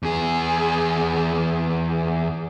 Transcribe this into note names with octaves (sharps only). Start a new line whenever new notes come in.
E2 G#4